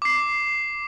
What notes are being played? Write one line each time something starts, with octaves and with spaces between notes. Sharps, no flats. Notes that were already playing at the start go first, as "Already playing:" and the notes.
D6 C7